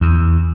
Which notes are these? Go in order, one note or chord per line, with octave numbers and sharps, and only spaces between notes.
E2